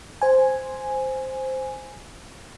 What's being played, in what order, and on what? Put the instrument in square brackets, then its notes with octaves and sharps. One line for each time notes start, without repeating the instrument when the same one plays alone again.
[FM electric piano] C5 G#5